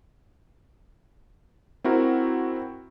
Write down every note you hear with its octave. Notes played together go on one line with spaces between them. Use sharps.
C4 E4 F#4 A#4